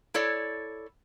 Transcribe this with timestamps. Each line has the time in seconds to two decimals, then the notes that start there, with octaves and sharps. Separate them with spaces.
0.14 E4 A4 C#5 D5